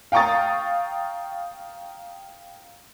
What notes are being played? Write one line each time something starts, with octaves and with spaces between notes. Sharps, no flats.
F5 G5 A#5 C#6 D#6 A6